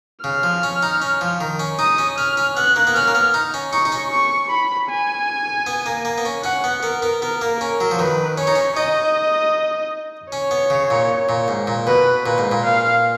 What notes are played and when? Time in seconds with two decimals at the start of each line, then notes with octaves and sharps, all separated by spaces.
0.24 C#3 F6
0.43 F3
0.63 C#4
0.83 D#4
1.02 C#4
1.21 F3
1.41 D#3
1.60 C#4
1.79 D#4 D#6
1.98 C#4
2.18 C#4 F6
2.37 C#4
2.57 B3 F#6
2.76 A#3
2.87 B3
2.95 C#4 F6
3.08 A#3
3.15 B3
3.34 D#4
3.54 C#4
3.73 D#4 C#6
3.85 D#4
3.92 C#4
4.11 C#6
4.50 B5
4.89 G#5
5.67 B3
5.86 A#3
6.05 A#3
6.18 B3
6.25 C#4
6.44 C#4 F#5
6.64 B3
6.82 B3 A#4
7.02 B3
7.22 B3 A#4
7.41 A#3
7.60 C#4 A#4
7.80 F#3
7.91 F3
7.99 D#3 B4
8.38 C#4 C#5
8.47 D#4
8.55 C#4
8.77 D#4 D#5
10.32 C#4 C#5
10.51 B3
10.70 C#3
10.90 A#2
11.29 A#2
11.48 G#2
11.67 A#2
11.87 B2 B4
12.26 A#2 B4
12.38 G#2
12.52 A#2
12.64 F5